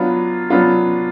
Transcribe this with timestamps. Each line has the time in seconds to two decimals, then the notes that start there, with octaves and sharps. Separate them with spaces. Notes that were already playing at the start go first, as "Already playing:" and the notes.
Already playing: F#3 B3 D4 F4
0.50 F#3 B3 D4 F4